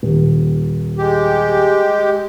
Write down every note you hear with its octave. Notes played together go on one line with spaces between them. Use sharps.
D#1
G#3 G4